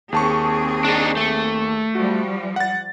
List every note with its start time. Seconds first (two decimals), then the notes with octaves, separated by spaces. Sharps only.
0.12 D#2 C4 G#4 A5 C#6
0.85 D4 D#4
1.17 A3
1.95 F3 G3 F#4
2.56 F#5 A6